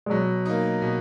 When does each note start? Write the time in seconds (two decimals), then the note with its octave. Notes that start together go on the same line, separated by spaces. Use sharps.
0.06 G#3
0.10 B2 F#3
0.45 A#3 D#4
0.82 B2